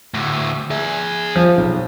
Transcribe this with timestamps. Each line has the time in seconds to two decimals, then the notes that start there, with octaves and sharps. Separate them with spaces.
0.14 D2 A2
0.71 G#4 E5
1.36 F3
1.57 B1